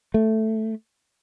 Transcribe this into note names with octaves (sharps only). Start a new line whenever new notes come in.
A3